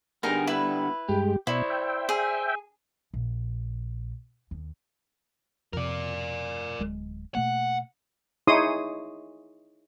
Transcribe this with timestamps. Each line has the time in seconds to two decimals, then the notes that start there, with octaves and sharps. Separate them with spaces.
0.23 D3 G3 B3 D#4 G#4 A#4
0.47 E4 B4
1.09 G2 G#3 G4
1.47 B2 E4 C5 D5
1.70 E5 G5
2.09 G#4
3.14 A#1
4.51 D#2
5.73 F2 C3 A#4 D5
6.79 D1 G#3
7.35 B2 A3 A#3 F#5
8.47 D#4 E4 G#4 C#5 C6 D#6